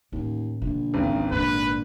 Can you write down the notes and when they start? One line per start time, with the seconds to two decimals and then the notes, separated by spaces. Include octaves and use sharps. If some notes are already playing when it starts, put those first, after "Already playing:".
0.12 A1 D#2
0.62 A#1 B2 D3
0.94 G#1 C#2 G#2
1.32 G#1 A#2 D3 D#4 B4